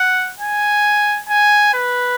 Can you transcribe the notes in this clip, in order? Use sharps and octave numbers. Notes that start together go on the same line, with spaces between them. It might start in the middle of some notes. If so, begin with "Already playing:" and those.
Already playing: F#5
G#5
G#5
B4